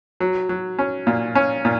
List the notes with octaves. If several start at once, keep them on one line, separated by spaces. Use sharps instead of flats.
F#3
F#3
C#4
A#2
C#4
A#2